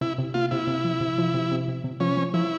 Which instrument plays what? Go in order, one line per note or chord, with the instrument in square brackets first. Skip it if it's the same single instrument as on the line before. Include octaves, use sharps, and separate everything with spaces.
[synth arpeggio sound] C3 [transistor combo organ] E4
[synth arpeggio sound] C3
[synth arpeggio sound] A#3 [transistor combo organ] F4
[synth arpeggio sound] C3 [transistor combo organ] E4
[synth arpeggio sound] C3
F3
C3
F3
C3
C3
C3
C3
[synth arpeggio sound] F3 [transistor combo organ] C#4
[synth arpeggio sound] F3
[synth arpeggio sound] F3 [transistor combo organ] E4